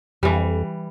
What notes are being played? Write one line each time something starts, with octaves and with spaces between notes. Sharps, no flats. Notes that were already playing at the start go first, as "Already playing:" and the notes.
F2 E3 G3